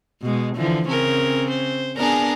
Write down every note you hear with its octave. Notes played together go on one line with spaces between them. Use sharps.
B2 G#3
D3 E3 F3
C#3 C4 C#4 A#4
C5
B3 D4 G#4 A#4 A#5